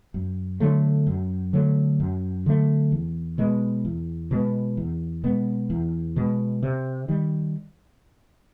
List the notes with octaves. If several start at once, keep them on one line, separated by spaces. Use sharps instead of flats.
F#2
D3 F#3 A3
F#2
D3 F#3 A3
F#2
D3 F#3 A3
E2
B2 G#3 B3
E2
B2 G#3 B3
E2
B2 G#3 B3
E2
B2 G#3 B3
C3
D#3 G3